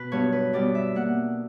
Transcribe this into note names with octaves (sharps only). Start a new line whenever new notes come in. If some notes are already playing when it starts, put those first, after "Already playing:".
Already playing: B2 B4
G2 F#3 B3 C#5
B4
B2 G3 B3 D5
E5
B2 A#3 F#5